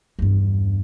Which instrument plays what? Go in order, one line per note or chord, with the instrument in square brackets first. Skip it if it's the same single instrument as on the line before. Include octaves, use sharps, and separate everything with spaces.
[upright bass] E2 G2